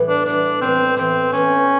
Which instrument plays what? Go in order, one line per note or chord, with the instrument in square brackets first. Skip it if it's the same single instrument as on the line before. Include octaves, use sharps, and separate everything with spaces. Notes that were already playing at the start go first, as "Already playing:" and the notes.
Already playing: [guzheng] A2 E3 G3 B3
[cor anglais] D4
[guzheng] A2 E3 G3 B3 [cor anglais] D4
[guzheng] A2 E3 G3 B3 [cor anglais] C4
[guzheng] A2 E3 G3 B3 [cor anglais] C4
[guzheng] E3 A3 D4 [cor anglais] C#4